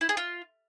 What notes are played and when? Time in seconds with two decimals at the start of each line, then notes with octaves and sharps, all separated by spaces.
0.01 E4
0.09 G#4
0.17 F4